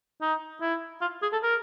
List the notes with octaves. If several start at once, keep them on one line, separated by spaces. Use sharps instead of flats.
D#4
E4
F4
G#4
A4
A#4